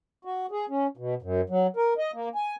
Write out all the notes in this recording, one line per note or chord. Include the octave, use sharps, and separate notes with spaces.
F#4
G#4
C#4
B2
F#2
F#3
A#4
D#5
A#3
G#5